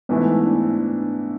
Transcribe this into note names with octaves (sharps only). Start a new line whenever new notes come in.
G#2 E3 A3 B3 E4
D4